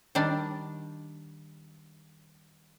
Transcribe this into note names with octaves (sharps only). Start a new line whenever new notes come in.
D#3 G3 D4